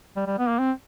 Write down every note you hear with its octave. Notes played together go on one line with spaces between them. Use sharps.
G3
G3
B3
A#3
C4